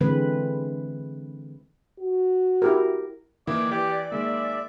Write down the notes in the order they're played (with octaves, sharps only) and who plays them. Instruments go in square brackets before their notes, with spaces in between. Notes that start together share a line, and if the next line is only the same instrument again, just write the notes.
[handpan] D3 E3 G#3 C4 B4
[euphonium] F#4
[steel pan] E4 G4 A#4
[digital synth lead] D#3 [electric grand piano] E3 A#3 E4 [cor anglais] D5
[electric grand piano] E3 [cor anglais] G4 [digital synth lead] D5
[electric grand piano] D#3 G#3 A#3 [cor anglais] E5